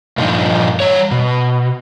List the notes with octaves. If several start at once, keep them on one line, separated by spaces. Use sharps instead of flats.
G2 A#2 D3 F3 D#4
G3 C#5
B2